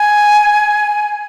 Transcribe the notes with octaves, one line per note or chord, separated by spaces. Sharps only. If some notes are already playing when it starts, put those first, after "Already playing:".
Already playing: G#5